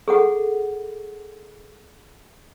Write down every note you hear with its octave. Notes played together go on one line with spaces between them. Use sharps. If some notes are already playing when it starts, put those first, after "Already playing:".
G#4 A4 F#5